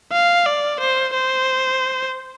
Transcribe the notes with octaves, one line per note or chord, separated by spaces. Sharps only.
F5
D5
C5
C5